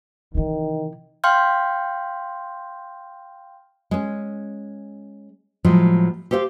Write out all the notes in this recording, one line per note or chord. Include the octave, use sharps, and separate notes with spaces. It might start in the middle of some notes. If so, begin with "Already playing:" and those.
C3 D#3 E3
F5 G5 C6 F6 G6
G#3 C#4
A2 F3 F#3 G#3
G4 A4 C5 F5